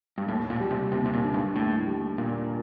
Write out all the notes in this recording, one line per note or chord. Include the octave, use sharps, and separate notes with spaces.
G2
D#2 A2
A#2
G3
C3
D#2 C3
C3
A#2
D3
G2
D#2 A2
G3
D#2 A#2